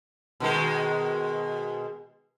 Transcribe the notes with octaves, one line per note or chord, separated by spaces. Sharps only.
B2 D#3 G#3